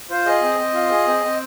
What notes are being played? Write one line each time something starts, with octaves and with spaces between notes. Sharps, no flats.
F4 C5
G#4 D#5
C4
C4
F4
G#4
C4
C4